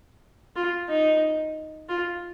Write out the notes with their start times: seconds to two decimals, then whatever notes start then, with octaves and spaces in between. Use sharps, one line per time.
0.56 F4
0.89 D#4
1.89 F4